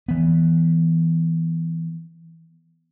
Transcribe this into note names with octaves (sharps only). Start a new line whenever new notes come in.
E3 B3